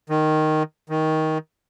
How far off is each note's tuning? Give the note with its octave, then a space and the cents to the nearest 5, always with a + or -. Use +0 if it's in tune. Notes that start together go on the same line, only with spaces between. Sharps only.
D#3 -5
D#3 +15